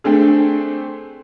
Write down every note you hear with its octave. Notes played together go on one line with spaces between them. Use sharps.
A3 C4 D4 G#4